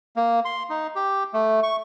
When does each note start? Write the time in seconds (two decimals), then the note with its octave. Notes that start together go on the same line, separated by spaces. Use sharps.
0.16 A#3
0.45 C6
0.70 D#4
0.96 G4
1.33 A3
1.63 C#6